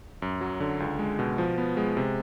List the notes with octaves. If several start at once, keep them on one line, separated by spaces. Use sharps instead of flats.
F#2
F#3
D3
C#2
G#3
B2
F3
B3
G#3
C3